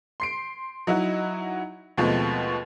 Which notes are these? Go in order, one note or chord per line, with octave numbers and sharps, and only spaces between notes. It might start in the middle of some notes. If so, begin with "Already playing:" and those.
C6 C7 D7
F#3 D#4 E4 F#4
D#2 B2 F3 G#3 A3 C4